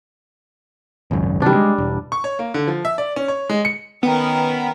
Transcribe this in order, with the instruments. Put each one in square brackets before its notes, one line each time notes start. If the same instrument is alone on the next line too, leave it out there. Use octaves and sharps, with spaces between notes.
[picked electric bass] G#1 C#2 F#2
[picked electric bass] C3 D#3 [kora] G3 D4
[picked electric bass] G#3
E1
[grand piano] C#6
C#5
A#3
D3
F3
E5
D5
C#4
C#5
G#3
C#7
[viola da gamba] D#3 C#4 A#4 [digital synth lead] B3 [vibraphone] B4 G5 A#5